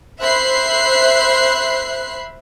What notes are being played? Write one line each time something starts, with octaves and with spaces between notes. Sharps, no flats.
C5 E5 B5 F#6 C7